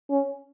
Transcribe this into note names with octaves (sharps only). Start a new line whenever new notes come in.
C#4